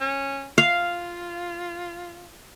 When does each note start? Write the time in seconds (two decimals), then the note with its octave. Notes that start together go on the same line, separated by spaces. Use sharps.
0.01 C#4
0.58 F4 F5